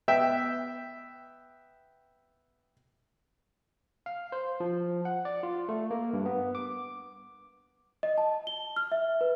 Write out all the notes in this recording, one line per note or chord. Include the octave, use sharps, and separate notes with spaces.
B3 E5 G5
F5
C5
F3
F#5
D5
F4
A3
A#3
G2
B3
D6
D#5
A5
G7
F6
E5
B4